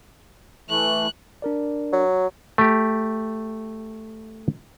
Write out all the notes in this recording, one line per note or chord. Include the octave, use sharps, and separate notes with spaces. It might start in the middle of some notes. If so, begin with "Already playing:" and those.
E3 A3 F#6
D4 A#4 D5
F#3
A3 G4